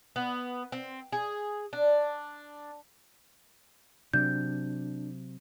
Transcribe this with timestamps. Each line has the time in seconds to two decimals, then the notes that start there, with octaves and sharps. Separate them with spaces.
0.16 B3
0.72 C4
1.12 G#4
1.73 D4
4.14 C3 F#3 D4 G6